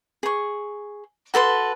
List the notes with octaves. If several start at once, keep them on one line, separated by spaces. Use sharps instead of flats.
G#4 C#6
F#4 A4 B4 C6